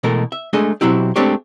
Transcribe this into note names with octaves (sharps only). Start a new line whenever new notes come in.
B2 E3 G#3 A3 A4 A#4
E5
G#3 A3 D4 G#4 D#5
B2 F#3 C4 E4 G4
G#3 A3 C4 D4 G4 C#5